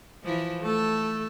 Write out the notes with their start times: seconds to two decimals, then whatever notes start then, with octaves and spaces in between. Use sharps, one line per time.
0.24 E3 F3 E4
0.62 A3 A4